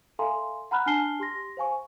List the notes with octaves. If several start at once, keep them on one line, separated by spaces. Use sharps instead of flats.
A4 E5 F5 G#5 A#5 C6
F#5 A#5 B5 F6 F#6
D4 G#5 A5 F6 C7 G7
G4 C6 A#6
C5 F5 G#5 C#6